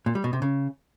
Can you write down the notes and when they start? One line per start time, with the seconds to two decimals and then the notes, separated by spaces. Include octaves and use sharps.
0.06 A#2
0.15 G3
0.24 B2
0.33 C3
0.42 C#3